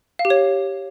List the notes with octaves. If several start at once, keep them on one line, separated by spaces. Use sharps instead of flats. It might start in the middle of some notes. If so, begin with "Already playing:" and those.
F5
G4
C#5